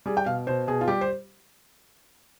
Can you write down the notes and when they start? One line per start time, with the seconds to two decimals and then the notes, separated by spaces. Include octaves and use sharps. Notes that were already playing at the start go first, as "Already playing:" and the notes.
0.06 G3 G#4
0.17 G5
0.26 B2 F5
0.47 B2 C5
0.67 B2 G#4
0.81 F4
0.88 G3 G4
1.01 C5